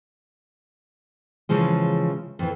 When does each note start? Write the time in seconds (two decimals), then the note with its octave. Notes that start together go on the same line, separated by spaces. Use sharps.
1.49 C#3 E3 F3 G#3
2.39 F2 E3